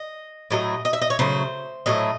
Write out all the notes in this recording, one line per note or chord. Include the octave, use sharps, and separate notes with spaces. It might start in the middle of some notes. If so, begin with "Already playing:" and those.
Already playing: D#5
A2 F#3 A3 D#5
D#5
E5
D#5
C#5
C#3 F#3 A3 C5
A2 F#3 A3 D#5